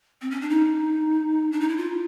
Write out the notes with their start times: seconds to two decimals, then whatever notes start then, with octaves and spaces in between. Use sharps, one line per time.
0.22 C4
0.31 C#4
0.41 D4
0.50 D#4
1.52 D4
1.61 D#4
1.69 E4
1.77 F4